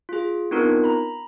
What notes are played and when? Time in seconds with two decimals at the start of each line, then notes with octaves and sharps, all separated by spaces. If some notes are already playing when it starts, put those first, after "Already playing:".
0.09 F4 G#4
0.51 B3 C4 D4 D#4 F4 A#4
0.84 A#5 B5